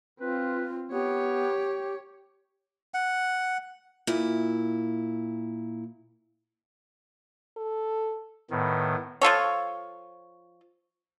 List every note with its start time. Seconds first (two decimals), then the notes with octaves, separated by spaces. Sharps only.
0.21 C4 F4 B4
0.92 B3 G4 C#5
2.94 F#5
4.07 A#2 E4
7.57 A4
8.51 A2 D#3 B3
9.21 F3 F4 A4 C#5